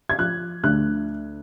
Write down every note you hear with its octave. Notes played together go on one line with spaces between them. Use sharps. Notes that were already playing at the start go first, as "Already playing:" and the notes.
G#6
F3 F#6
D2 F#6